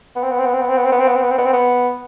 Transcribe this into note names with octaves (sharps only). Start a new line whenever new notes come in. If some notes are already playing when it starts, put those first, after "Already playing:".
B3
C4
B3
C4
B3
C4
B3
C4
B3
C4
B3
C4
B3
C4
B3
C4
B3
C4
B3